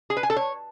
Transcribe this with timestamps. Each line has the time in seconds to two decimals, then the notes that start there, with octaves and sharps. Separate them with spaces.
0.10 G#4
0.17 B4
0.23 G#5
0.30 A4
0.36 C#5